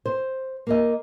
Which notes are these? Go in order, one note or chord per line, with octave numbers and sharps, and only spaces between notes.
C5
A#3 A#4 D#5